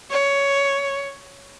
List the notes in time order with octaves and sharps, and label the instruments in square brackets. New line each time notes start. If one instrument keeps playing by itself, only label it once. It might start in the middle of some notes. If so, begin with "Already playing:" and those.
[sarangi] C#5